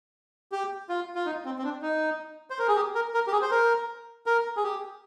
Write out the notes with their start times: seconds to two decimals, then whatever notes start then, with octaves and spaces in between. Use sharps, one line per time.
0.52 G4
0.89 F4
1.15 F4
1.26 D#4
1.45 C4
1.58 C4
1.64 D4
1.82 D#4
2.50 C5
2.59 A#4
2.68 G#4
2.76 G4
2.95 A#4
3.14 A#4
3.27 G4
3.32 G#4
3.42 C5
3.51 A#4
4.26 A#4
4.57 G#4
4.64 G4